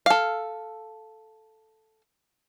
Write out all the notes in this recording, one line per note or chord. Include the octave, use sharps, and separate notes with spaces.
A4 F5